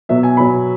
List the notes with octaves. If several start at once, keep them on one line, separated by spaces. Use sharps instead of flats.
B2 F#3 B3 E5
G#5
B2 F#3 B3 B5